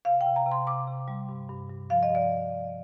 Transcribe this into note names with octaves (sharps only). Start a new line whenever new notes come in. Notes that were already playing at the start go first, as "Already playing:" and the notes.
C3 F5
G5
C3
A#5
C3
C6
C3 D6
C3
G3
G2
G2
G2
F3 F5
D#5
G2 D5